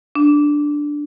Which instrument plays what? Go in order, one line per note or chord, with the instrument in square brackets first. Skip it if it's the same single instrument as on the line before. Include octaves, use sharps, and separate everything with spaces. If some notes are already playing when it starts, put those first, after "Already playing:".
[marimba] D4